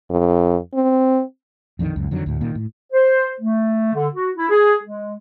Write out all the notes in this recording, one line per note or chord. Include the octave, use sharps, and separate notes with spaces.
F2
C4
A#1 F2 D3 D#3
C#2 F#2
F2 D3 D#3 F#3
D2 A2
A#2 D#3 A#3
A2
C5
A3
D3
F#4
E4
G#4
G#3